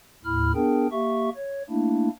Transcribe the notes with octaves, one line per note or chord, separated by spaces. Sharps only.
D#2 A2 E4 B5 F6
B3 D4 G#4 A#4 G5
A#3 G4 E5 C#6
C#5
A3 A#3 D4 E4